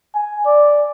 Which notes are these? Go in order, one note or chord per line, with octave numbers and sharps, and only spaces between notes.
G#5
D5